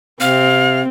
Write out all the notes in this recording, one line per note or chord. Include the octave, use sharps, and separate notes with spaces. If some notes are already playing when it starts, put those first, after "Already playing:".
C3 C4 F5